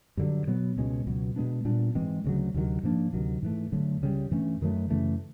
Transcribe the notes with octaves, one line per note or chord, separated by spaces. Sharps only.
G2 D3 F#3
B2 F#3 B3
C#2 B2 G#3 C#4
C#2 B2 F#3
B2 G#3 B3 D4
A#2 G3 B3 D4
G#2 E3 G#3 C4
D2 C#3 F#3
D2 C3 D#3 F#3
G#2 F3 A#3 D4
D2 C3 D#3 F#3
G#2 E3 A3
G2 D3 F#3 A3
C#2 C#3 E3 G3
G2 E3 A3 C#4
F#2 D#3 F#3 A3
F#2 C#3 E3 A3